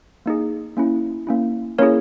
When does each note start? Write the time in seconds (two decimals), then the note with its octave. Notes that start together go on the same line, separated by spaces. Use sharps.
0.26 A#3 D#4 G#4
0.77 A#3 C#4 E4
1.27 A#3 C#4 E4
1.78 A#3 C#4 E4 G#4 A#4 C#5